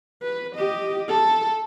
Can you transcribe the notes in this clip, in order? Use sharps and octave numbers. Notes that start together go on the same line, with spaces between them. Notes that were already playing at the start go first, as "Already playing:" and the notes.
B4
G4 D#5
A4